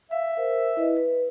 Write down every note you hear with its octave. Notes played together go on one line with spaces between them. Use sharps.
E5 F5
A#4 C5
E4 B4 D#5
B4